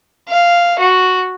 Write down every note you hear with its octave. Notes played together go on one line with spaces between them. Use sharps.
F5
F#4